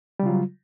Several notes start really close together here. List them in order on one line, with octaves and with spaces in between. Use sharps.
G3 C#3 F4 F#3